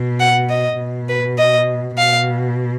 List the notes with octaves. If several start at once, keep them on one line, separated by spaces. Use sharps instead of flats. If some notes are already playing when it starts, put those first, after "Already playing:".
Already playing: B2
F#5
D#5
B2
B4
D#5
B2 F5